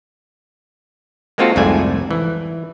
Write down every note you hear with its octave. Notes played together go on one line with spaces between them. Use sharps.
G#3 A#3 C4 F4 F#4 A4
C2 F2 G#2 A3 D5 G#5
E3